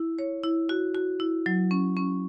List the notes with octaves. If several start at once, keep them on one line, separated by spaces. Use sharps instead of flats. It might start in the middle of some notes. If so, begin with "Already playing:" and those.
Already playing: E4
C#5
E4
F#4
F#4
E4
F#3
C#4
C#4